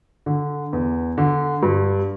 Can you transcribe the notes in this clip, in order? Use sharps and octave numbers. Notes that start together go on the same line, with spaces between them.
D3
E2
D3
G2